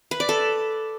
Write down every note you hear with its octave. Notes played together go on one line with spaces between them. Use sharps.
B4
D5
A4